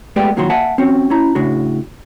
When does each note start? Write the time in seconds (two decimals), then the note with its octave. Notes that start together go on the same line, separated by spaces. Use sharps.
0.16 G#3 A3 B3 G4 B4 D5
0.36 C2 A#2 D#3 F#3 F#4 C6
0.50 A#3 E5 F#5 G#5 A5
0.78 C4 C#4 F#4
1.10 C#4 E4 A#5
1.35 A2 C#3 D4 F#4